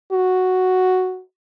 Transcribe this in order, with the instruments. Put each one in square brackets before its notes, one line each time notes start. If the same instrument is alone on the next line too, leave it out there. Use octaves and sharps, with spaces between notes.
[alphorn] F#4